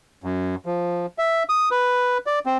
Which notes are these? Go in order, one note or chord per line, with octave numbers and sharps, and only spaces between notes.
F#2
F3
E5
D#6
B4
D5
C4